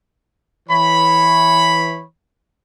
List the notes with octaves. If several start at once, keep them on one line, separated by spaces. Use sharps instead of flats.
E3 C#5 B5